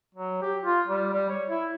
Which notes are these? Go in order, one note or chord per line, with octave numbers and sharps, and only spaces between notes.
F#3
G4
F4
G3
G3
C#5
E4